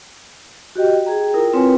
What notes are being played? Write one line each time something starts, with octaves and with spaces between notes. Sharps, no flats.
F#4 G4 D#5 G5
G#4 G5 A#5
E4 F4 A#4 G5 D#6
C4 F4 B4 C#5 G5 G#5